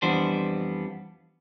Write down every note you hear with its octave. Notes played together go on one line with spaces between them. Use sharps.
F2 E3 G3 B3 D4 C5